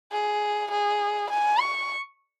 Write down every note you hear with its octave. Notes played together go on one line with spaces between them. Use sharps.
G#4
G#4
G#5
C#6